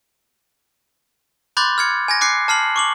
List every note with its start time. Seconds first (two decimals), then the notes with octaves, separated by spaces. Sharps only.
1.57 B5 C6 D6 F#6 G6 A6
1.78 F6 G#6 C#7
2.08 G#5 G#6 A#6
2.21 D6 F#6 C7 C#7
2.48 A5 F6 C7 F#7
2.76 C#6 D6 F#7